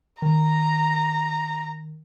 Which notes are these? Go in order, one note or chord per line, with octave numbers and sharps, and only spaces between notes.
D#3 A#5